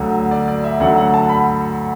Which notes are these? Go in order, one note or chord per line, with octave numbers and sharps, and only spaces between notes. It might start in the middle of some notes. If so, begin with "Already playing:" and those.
Already playing: D2 D3 F#3
D5
D5
E5
D2 D3 F#3 F#5
F#5
A5
B5